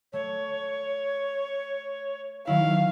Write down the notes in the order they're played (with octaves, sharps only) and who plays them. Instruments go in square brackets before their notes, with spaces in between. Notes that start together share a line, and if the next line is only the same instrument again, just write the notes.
[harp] A3 [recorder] C#5
[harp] D#3 F#3 E4 [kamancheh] F5